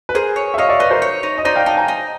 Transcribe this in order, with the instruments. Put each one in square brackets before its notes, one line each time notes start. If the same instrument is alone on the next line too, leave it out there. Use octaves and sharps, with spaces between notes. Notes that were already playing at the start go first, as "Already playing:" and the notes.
[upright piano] B4
[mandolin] G#4 [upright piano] A#4 C5
[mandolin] C#5
[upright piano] E5
[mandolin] C#5 [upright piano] D#5 F5
[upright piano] D5 E5
[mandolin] D#4 [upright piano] B4
[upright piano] A#4 C5
[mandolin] C#5
D#4
[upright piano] D#5
[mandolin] D#4 [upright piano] C5 D5
[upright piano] F5 G5
[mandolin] D#4 [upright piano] G5 A5
[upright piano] G#5 A#5
[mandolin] D#4